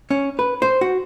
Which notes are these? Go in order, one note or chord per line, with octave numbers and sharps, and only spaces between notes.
C#4
B4
C5
F#4